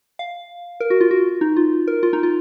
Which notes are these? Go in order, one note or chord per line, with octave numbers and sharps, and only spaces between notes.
F5
A#4
F#4
F4
F#4
D#4
F4
A#4
F4
D#4
F4